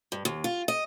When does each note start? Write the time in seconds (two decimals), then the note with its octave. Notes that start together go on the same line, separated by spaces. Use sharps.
0.12 G2
0.25 D#2
0.44 F4
0.68 D#5